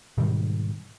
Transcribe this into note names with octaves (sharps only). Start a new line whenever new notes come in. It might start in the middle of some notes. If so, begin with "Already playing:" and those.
G#2 B2 D#3 G3